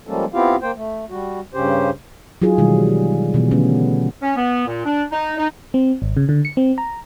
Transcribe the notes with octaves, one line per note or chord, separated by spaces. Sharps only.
F3 G3 G#3 A#3 C#4 A4
B3 C4 E4 F4 G4 F5
A#3 C5 G5
A3
G3 F#4
G2 C#3 C#4 G4 C5
F#3 D#4 F4 G#4
B2 D#3 E3 G3 G#3
B2 E3 B3
D3 A3 B3 C#4
C#4
B3
A#2
D4
D#4
D#4
C4
G#1
C#3
D3
C#7
C4
A#5